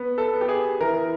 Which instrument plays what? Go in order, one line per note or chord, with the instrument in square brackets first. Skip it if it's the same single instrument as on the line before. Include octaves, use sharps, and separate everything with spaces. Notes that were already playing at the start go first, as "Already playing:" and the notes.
Already playing: [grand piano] B3
A4
B3
G4
G#4
E3 A#4